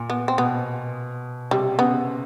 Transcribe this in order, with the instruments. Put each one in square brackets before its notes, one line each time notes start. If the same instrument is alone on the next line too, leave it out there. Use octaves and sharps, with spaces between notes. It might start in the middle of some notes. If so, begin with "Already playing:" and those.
Already playing: [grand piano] A#2
[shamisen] B3
C4
[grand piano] B2 [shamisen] B3
[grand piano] C3 [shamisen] G3
[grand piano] C#3 [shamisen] B3